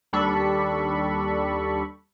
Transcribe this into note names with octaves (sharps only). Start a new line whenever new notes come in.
D#2 G3 D4 A4 B5 C#6